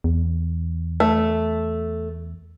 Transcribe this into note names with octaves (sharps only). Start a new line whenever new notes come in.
E2
A3